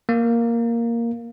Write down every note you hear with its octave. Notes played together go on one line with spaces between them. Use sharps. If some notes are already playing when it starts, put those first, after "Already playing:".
A#3